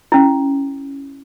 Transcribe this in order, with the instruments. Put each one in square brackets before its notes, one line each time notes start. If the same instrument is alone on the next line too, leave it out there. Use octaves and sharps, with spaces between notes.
[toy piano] C#4 E4